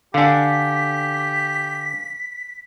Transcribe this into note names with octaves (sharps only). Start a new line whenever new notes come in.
D3 D4 G4 F5 G#5 B6